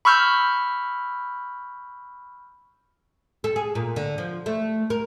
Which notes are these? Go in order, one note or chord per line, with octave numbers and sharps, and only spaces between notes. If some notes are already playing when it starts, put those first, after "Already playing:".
B5 C#6 E6 F6 G6
A4
G#4
A#2
D3
F3
A3
A#4